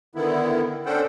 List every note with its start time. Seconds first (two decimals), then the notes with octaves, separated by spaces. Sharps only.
0.15 D3 D#3 B3 E4
0.86 C#4 D4 A4 C5 F#5 G5